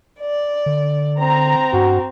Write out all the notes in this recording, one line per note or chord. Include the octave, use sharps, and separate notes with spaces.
D5
D3
C4 A#5
G2 F#4